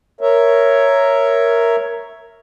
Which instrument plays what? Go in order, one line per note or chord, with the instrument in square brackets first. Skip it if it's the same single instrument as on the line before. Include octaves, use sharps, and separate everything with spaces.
[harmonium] A#4 C#5 E5